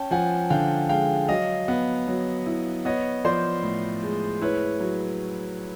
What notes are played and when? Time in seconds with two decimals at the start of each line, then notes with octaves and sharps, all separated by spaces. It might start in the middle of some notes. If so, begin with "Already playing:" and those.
Already playing: C#4 G5 A5
0.11 F3 F#5 G#5
0.50 D3 F5 G5
0.89 G#3 F5 G5
1.28 F#3 D#5 F5
1.68 B3
2.07 F#3
2.46 E4
2.85 B3 C#5 D#5
3.25 F3 C5 D5
3.63 A2
4.03 G#3
4.41 E4 B4 C#5
4.80 F#3